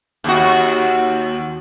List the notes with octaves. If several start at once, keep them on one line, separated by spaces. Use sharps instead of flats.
D#2 F#4